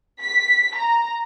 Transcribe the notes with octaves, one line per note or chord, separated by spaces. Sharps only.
B6
A#5